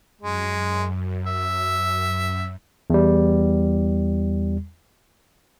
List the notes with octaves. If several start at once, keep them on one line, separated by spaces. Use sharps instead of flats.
F#2 G#3
E5
E2 G3